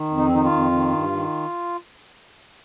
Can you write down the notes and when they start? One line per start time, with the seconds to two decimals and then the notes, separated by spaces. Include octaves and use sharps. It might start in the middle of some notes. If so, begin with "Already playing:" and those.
Already playing: D#3
0.10 F2
0.17 D#4
0.26 C4
0.31 D#3 D#4
0.44 F4
0.51 F2
0.71 D#3
0.92 G2
1.12 D#3